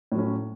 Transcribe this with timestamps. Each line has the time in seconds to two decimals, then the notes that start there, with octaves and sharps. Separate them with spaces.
0.12 A2
0.15 F#3
0.19 C#4